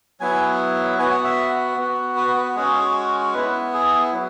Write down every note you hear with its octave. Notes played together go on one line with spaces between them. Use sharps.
F#3 B3 E4 G#5
B3 F#4 G#5
F#5
E5
B3 F#4
B4
B4
G#3 C#4 F#4 G#4
B3 E4 B4
G#4
F#3